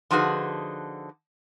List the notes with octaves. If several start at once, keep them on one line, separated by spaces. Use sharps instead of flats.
D3 F3 D#4 F#4 G#4 B4